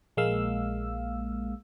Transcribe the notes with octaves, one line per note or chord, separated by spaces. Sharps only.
A#1 G#3 A#3 F5 E6